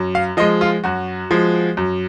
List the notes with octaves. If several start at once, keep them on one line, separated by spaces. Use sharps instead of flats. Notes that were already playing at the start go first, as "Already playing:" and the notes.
Already playing: F#2
F5
F3 G#3 D#5
F4
F#2 F#4
F3 G#3
F#2